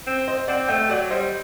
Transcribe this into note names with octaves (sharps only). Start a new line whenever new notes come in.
C4
C5 D#5
C4 D5 F#5
A3 D#5 G5
F#3 D5 F#5
G3 C5 D#5